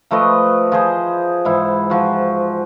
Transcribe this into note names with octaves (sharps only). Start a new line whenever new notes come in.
F3 A3 B4 D#5
F3 G#4 C5
G#2 E3 E4
F3 F#4